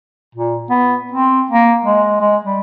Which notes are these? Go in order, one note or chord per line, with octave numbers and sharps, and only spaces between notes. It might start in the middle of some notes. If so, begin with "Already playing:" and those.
A#2
B3
C4
A#3
G#3
G#3
G3